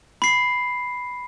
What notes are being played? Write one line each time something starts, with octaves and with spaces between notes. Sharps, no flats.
B5 C7